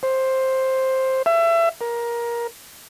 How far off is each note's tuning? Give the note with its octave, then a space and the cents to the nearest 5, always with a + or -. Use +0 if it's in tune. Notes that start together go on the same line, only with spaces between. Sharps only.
C5 +10
E5 +30
A#4 +20